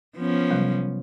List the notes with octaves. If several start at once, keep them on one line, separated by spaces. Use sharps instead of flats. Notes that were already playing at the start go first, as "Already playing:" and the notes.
F3 B3 C#4
C3 F#3 G3